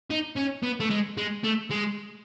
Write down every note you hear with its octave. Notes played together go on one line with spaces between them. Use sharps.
D#4
C#4
B3
A3
G#3
G#3
A3
G#3